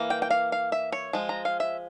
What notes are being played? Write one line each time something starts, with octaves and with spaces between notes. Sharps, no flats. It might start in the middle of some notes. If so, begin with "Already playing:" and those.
Already playing: E3 A#3
G5
G5
F5
F5
E5
C#5
F3 G#3
A#5
F5
E5